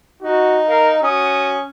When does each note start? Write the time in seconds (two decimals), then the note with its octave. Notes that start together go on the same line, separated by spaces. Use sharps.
0.23 D#4 F#4
0.68 A#4 F5
1.03 C#4 F#4 D#6